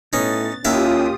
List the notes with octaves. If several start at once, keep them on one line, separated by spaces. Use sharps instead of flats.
A2 B3 C#4 D#4 A6
D#2 A#3 C#4 E4 F4 G4 F5 D#6